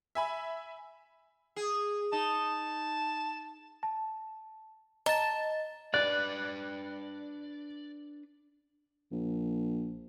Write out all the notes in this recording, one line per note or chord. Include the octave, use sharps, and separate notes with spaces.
E5 G#5 B5
G#4
D#4 A5
A5
D#5 A5 A#5 A6
D4 B4 D5 F#6
A#1